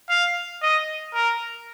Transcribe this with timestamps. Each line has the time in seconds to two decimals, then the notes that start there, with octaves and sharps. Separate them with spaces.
0.09 F5
0.62 D#5
1.14 A#4